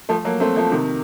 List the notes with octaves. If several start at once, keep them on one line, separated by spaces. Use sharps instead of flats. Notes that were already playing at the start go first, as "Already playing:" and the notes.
F3 A3
F#3 A#3
A3 C4
F3 A3
C3 D#3